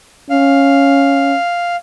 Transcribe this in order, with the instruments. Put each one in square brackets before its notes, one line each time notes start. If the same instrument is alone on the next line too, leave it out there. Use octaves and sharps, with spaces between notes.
[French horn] C#4 [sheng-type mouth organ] F5